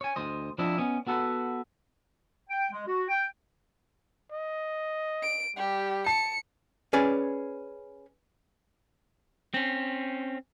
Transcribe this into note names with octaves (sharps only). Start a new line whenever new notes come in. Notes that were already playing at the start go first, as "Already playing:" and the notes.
C#5 G#5
D2 C5 D#5
F3 C4 D4 E4 D#5
B3 C#4 D#5
B3 F#4 A4 B4
G5
G#3
F#4
G5
D#5
D7
G3 G4
A5 C#7
C#4 G#4 B4 D5
C4 C#4